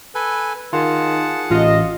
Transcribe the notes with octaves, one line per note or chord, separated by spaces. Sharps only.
A4 B4 G#5
D#3 F4 G#4 F#5 A5
A1 F4 D#5